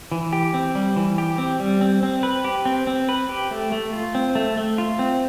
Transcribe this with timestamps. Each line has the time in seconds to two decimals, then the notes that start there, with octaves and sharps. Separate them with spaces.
0.12 E3
0.33 G4
0.54 C4
0.75 G3
0.96 E3
1.18 G4
1.38 C4
1.60 G3
1.81 C4
2.03 C4
2.23 B4
2.45 G4
2.65 C4
2.87 C4
3.09 B4
3.29 G4
3.51 A3
3.72 A3
3.93 F4
4.15 C4
4.35 A3
4.57 A3
4.78 F4
4.99 C4